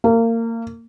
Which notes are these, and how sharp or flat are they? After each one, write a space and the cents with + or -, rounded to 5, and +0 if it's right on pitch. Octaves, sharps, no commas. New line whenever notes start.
A#3 -30